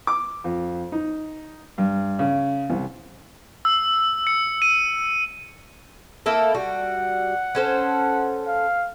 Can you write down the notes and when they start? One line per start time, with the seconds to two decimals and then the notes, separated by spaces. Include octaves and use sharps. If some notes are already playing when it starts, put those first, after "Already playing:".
0.07 D6
0.44 F2
0.92 D#4
1.78 G2
2.19 C#3
2.70 C2
3.65 E6
4.27 C#7
4.62 D#7
6.26 A#3 E4 A4
6.55 G3 F#4 F#5
7.55 C#4 A4 C5
8.47 F5